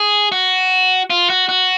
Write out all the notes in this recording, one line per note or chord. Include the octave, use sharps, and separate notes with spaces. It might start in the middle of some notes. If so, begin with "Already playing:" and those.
Already playing: G#4
F#4
F4
F#4
F#4